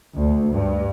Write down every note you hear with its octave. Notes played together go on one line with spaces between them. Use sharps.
D2
G2